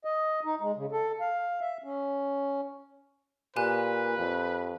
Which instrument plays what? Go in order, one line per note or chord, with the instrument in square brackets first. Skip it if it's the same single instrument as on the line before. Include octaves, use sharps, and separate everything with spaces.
[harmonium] D#5
D#4
G#3
C#3
A4
F5
E5
C#4
[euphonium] A#2 [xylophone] G4 G#5 F#6 [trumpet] B4
[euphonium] F2